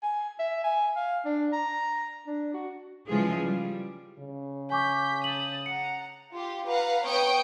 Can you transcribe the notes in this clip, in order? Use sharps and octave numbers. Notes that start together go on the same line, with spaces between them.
G#5
E5
G#5
F5
D4
A#5
D4
F#4
C#3 E3 F3 G#3 F4 G#4
G3
C#3
G#5 C#6 D6 G6 B6
A5 D#6 F#7
F#5 A#5 C#7
F4 G4
B4 F5 F#5 A#5
B3 C#5 G5 C#6 D#6 D7